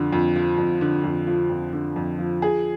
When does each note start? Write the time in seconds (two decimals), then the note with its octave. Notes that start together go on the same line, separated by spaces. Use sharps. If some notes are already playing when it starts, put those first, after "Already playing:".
Already playing: F2 D3
0.13 F2
0.36 F3
0.58 F2
0.81 D3
1.04 F2
1.27 F3
1.50 F2
1.73 D3
1.96 F2
2.19 F3
2.42 G#4